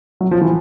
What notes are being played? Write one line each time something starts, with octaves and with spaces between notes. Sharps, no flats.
F#3
F3
E3